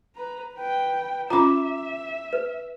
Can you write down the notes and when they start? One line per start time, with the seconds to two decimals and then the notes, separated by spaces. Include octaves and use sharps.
0.15 B4 A#5
0.55 B4 G5
1.30 C#4 F4 E5 A#5 D6
2.33 B4